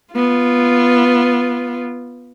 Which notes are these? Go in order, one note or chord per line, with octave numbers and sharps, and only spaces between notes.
B3 F4